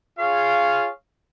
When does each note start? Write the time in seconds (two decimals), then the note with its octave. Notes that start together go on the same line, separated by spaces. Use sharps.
0.19 F4 G#4 C#5 F5